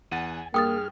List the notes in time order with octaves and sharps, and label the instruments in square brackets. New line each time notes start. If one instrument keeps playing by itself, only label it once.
[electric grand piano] E2 F#5 A6 [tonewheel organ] G#5
[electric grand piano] G2 [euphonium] A#3 [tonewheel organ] G#4 F6 [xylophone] G5 D#6 A6